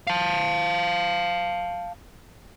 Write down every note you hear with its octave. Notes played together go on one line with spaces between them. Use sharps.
F5 A5